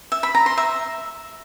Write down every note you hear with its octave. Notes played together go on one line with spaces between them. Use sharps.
E5
B5
A#5
C6
E5